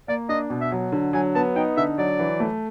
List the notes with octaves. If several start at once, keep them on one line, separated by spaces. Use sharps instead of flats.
A#3 D5
D4 D#5
B2
E5
F#3
D3
F#3 G#5
B3 A5
D#4 G5
D3 E5
F#3 D5
E3
A3